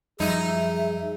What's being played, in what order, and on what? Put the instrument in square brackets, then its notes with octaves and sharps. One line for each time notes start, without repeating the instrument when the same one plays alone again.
[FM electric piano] F#2 F3 G3 [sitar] D#4 [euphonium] G#4 [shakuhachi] E5